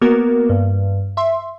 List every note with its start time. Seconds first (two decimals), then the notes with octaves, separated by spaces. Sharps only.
0.01 A#3 B3 F#4 A#4
0.49 G2
1.17 E5 C6